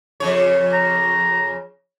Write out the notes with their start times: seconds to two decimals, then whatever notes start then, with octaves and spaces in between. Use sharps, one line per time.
0.20 F2 C#3 C#5
0.73 A#5